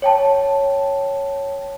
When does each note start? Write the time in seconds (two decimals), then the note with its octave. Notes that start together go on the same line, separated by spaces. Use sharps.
0.02 C#5 G5 A5